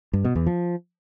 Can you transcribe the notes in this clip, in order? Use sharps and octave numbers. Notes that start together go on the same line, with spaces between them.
G2
B2
E2
F3